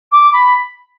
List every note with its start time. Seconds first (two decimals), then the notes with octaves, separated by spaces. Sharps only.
0.11 D6
0.32 B5